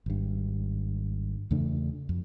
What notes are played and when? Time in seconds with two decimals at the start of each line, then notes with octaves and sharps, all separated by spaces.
0.06 G#1 G2
1.51 E2 C#3 A3 D4
2.09 F2